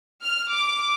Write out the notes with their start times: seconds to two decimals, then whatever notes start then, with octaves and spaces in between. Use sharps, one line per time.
0.23 F6
0.52 D6